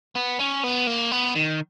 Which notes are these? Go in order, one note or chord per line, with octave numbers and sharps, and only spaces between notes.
B3
C#4
B3
A#3
B3
D#3